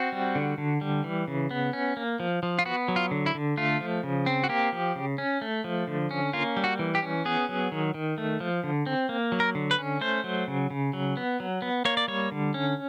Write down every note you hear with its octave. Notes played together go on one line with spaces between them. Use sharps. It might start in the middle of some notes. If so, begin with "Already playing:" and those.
Already playing: C4 F#4
G3
D3
D3
G3
E3
C#3
B3
C#4
A#3
F3
F3
F4
B3 F#4
F#3
F4
D3
E4
D3
A3 F4
F3
C#3
C4
F#4
A#3 G4
F3
C#3
C#4
A3
F3
D3
C#4
A#3 F4
G3
F#4
E3
G4
C#4
B3 G#4
F#3
D#3
D#3
A3
F3
D3
C4
A#3
F#3
A#4
D3
B4
C#4
A3 C5
F#3
C#3
C#3
F#3
B3
F#3
B3
A#3 C#5
D5
G3 C#5
D3
C#4